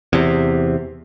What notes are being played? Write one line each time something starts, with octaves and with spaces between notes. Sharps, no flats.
E2 C3